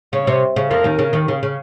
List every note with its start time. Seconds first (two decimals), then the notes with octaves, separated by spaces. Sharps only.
0.13 C#3 C#5
0.27 C3
0.56 C#3
0.70 F2 F3 A#4
0.84 D#2 D#3
0.99 C#3
1.13 D#2 D#3
1.28 C#3
1.43 C#3